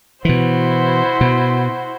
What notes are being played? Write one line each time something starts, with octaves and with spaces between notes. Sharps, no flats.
B2 E3 E4 F#4 C5
B2